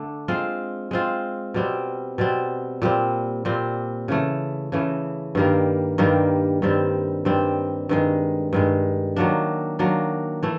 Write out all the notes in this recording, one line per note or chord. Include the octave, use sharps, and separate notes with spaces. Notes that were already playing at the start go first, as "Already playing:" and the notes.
Already playing: D3 A3 D4
G#3 C4 F4
G#3 C4 F4
B2 G3 C4
B2 G3 C4
A#2 G3 C4
A#2 G3 C4
C#3 E3 A3
C#3 E3 A3
G2 D#3 G3 A#3
G2 D#3 G3 A#3
G2 D#3 G3 C4
G2 D#3 G3 C4
G2 D#3 G#3
G2 D#3 G#3
D#3 F#3 A#3 D4
D#3 F#3 A#3 D4
E3 A3